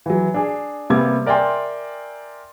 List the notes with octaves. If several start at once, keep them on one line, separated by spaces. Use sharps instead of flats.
E3 F#3
D4 G#4
C3 G3 A#3 B3 D6 G#6
A#4 D5 E5 G5 G#5 C6